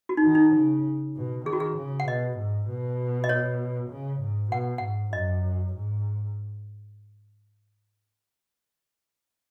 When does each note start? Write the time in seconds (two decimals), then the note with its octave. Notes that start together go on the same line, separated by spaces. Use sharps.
0.09 F#4
0.17 D#4
0.24 D#3
0.35 D#4
0.55 C#3
1.15 B2
1.46 D#3 G#4
1.53 F#4
1.60 G#4
1.77 C#3
2.00 F#5
2.07 B2 D#5
2.38 G#2
2.69 B2
3.24 D#5
3.29 C#5
3.90 C#3
4.21 G#2
4.51 B2 F#5
4.78 G#2 F#5
5.13 F#2 D#5
5.74 G#2